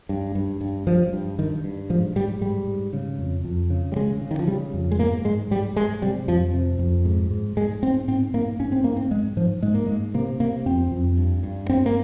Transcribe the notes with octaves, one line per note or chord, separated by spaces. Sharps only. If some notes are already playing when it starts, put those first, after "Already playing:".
G2
G2
G2
G2 F3
G2
G2 D#3
G2
G#2 F3
G#2 G3
G#2 G3
G#2
C#3
F2
F2
C#3
G3
C#3 G#3
C#3
D#3
F3
C#3 G3
F2
G#3
G#2 A#3
G#2 G#3
G#2 G3
G#2 G#3
C3 G3
F2 F3
C3
F2
G#2
G#2
G#2 G#3
G#2 C4
G#2 C4
G#2 A#3
G#2 C#4
C4
G#2 A#3
C4
G#2 G#3
G#2 F3
G#2 G#3
A#3
G#2 G#3
C3 A#3
C3 A#3
F2 C4
F2
G2
G2
G2 C4
A#3